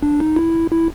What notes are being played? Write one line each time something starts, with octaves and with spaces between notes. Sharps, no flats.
D4
D#4
E4
E4